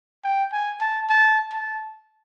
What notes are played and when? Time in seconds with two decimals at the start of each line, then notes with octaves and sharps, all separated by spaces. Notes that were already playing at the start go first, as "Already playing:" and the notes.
0.24 G5
0.53 G#5
0.80 A5
1.09 A5
1.53 A5